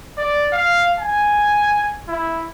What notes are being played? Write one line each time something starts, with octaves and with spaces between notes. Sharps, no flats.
D5
F5
G#5
E4